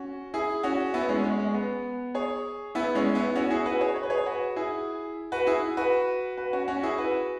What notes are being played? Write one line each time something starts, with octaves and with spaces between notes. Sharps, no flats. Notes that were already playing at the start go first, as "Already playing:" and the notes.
Already playing: C#4 F#4
E4 G#4
C#4 F#4
B3 E4
G#3 C#4
G#3 C#4
G#3
B3
G#4 C#5
B3 E4
G#3 C#4
B3 E4
C#4 F#4
E4 G#4
F#4 B4
G#4 C#5
C#5
B4
G#4 C#5
F#4 B4
E4 G#4
F#4 B4
E4 G#4
F#4 B4
F#4 B4
C#4 F#4
C#4 F#4
E4 G#4
F#4 B4